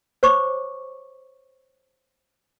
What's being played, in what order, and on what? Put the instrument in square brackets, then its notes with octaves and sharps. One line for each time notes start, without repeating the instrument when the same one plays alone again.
[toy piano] C5 C#5 C#6 D6